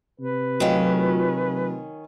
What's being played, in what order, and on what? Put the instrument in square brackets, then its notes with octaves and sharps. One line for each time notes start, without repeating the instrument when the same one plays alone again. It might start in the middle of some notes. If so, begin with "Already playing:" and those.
[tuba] C3 [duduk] B4
[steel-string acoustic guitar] D#3 C#4 [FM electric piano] F#3 A3 F4